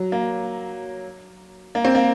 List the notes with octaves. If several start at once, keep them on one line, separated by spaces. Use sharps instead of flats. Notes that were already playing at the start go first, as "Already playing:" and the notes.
Already playing: F#3
A#3
A#3
C4
A#3